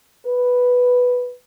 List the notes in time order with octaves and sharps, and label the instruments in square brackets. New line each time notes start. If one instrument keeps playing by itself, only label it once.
[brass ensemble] B4